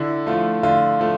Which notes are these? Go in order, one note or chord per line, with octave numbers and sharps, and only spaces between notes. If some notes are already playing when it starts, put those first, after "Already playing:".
Already playing: D3 E4
F3 A3 F4
D3 F4
F3 A3